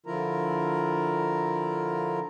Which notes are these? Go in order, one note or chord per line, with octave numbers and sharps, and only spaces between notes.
D3 F3 E4 F4 A#4 A#5